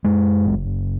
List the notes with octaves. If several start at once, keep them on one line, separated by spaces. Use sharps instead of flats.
F#2 G#3
F#1